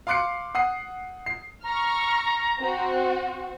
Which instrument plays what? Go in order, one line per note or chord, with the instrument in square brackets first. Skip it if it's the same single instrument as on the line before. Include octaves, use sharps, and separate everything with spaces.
[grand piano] F5 C6 D6 F#6 C7 C#7
F#5 D#6 C7
C7
[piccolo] A#5 [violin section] C#6 F6
[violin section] C4 F#4